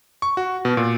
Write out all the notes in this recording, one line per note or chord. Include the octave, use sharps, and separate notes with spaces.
C#6
F#4
B2
A#2